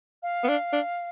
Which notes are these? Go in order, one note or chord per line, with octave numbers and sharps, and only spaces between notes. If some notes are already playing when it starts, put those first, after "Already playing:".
F5
B3
D4
D4